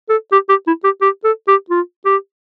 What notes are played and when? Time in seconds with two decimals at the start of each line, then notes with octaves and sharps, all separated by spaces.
0.09 A4
0.32 G4
0.49 G4
0.67 E4
0.84 G4
1.02 G4
1.25 A4
1.48 G4
1.70 F4
2.05 G4